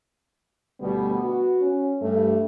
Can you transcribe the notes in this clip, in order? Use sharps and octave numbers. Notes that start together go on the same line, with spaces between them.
D2 B2 G3 B3
F#4
C#4
G2 A3